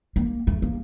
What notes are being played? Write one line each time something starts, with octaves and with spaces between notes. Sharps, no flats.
A#3
A3
A#3